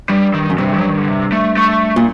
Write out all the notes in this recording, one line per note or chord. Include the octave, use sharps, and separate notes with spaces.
G2 G3
D#3
F#2
G2 C3
F#3
D#3
D3
C3
A3
A3
A#2